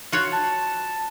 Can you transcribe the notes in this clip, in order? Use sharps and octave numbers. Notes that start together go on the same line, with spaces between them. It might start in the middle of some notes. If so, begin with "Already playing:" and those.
F4 F#4 C#5
A5